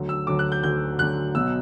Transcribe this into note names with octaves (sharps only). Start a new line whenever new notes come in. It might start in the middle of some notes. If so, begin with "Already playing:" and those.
Already playing: D2 D3 F#3
E6
D2 D3 F#3 D6
F#6
G6
D2 D3 F#3 G6
D2 D3 F#3 F#6
B1 B2 F#3 E6